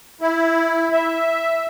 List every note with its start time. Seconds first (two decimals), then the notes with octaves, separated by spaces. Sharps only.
0.21 E4
0.92 E5